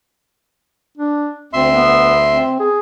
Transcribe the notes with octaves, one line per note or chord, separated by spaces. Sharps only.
D4
D2 C4 E5 C6
B3
C4
G#4